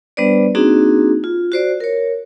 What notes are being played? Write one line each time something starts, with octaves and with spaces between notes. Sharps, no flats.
G3 B3 D4 B4 C5 D5
A#3 C4 D4 D#4 F#4 G#4
F4
F#4 C5 D5
A#4 C#5